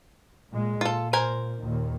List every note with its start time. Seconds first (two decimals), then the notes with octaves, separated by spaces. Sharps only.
0.51 A#2 G#3
0.81 A#2 F4 A4
1.13 A#4 C5 G#5
1.59 D#2 A#2 D#3